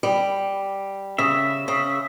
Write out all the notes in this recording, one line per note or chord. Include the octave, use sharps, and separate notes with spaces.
G3
C#3 E5
C#3